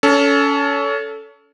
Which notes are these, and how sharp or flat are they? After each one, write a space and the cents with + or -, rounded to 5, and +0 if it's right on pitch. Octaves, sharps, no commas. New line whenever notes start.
C#4 +25 A4 +0